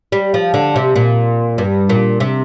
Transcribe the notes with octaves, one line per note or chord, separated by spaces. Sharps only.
G3
F3
D3
C3
A#2
G2
A#2
C3